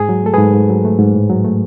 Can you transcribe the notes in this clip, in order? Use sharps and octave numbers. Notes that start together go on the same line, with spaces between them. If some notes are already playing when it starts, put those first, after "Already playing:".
Already playing: G#2 G#4
F#3
A3 A4
G#2 G#4 B4
G#2
F#3
A3
G#2
A2
F#3
A3